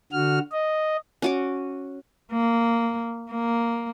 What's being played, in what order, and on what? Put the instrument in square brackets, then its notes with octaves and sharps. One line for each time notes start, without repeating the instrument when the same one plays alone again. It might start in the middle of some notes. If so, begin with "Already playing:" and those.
[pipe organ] D3 F#4 F6
D#5
[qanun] C#4 F#4 D6
[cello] A#3
A#3